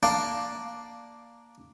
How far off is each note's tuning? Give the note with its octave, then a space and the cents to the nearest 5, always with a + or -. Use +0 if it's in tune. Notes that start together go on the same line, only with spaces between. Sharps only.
A#3 +5 D4 +0 F5 +0